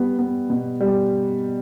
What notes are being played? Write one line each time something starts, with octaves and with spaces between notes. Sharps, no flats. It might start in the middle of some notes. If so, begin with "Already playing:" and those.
Already playing: G3 B3
B3
B2
G3